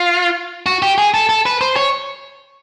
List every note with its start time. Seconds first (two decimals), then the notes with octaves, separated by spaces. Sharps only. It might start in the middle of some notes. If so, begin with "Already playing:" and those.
Already playing: F4
0.66 F#4
0.82 G4
0.98 G#4
1.14 A4
1.29 A4
1.46 B4
1.61 C5
1.76 C#5